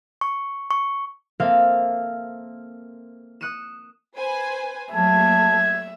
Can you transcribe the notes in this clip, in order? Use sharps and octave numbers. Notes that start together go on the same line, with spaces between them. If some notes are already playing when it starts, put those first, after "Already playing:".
C#6
C#6
A#3 C4 A4 A#4 E5 F5
D#6 F#6 C#7 D#7 E7
B4 C5 G#5
F#3 A3 A#3 E5 A5 G#6